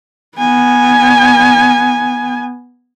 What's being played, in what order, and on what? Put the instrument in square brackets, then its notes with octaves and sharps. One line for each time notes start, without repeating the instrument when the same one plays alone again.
[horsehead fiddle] B3 G#5